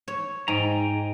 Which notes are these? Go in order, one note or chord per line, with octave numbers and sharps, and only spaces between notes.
C#5
G#2 G5 G#5 A#5